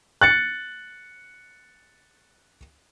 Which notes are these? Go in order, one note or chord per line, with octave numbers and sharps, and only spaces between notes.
F#6 A6 C#7